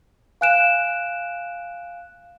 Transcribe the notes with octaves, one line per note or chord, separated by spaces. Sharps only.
F5 G#5 F#6 D7 E7